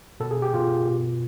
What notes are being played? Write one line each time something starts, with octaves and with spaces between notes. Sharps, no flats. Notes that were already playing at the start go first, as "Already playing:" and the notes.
B2 A4
G#4
G4
B2 F4
B2